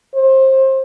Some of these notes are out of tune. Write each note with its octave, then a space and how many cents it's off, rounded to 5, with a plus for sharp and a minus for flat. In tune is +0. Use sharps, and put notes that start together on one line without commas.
C5 +25